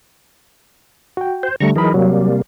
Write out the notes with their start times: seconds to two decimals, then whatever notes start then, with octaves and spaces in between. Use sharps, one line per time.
1.17 F#4 G5
1.43 C5
1.60 D3 G3 A3 A#5 C#6
1.76 E3 F#3 D#4 G#4 A#4 B5
1.94 C3 F#3 G3 A#3